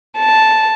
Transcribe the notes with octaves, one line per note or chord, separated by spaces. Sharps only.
A5